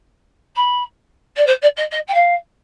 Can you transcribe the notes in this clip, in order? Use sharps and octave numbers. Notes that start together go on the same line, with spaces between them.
B5
D5
C5
D5
D#5
D#5
G5
F5